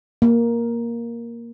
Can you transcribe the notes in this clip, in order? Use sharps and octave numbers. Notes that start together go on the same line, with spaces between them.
A#3